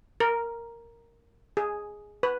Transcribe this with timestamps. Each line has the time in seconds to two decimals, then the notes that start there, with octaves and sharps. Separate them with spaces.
0.20 A#4
1.57 G#4
2.23 B4